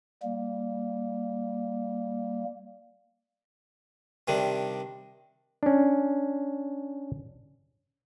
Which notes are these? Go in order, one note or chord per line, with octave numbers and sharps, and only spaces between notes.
G3 A#3
C3 D#3 G3 D4
C#4 D4